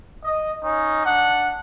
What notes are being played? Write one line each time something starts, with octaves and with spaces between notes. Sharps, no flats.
D#5
C#4 D#4
D4 F#5